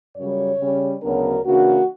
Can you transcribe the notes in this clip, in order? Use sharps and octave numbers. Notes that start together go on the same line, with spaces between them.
F#2 C#3 G3 C#5
C#3 G3 C#4
D2 C#3 F#3 B3 D4 A#4
C#3 E3 A#3 D4 F#4